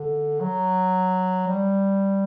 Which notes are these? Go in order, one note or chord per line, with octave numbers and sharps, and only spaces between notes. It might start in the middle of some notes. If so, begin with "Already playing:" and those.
Already playing: D3
F#3
G3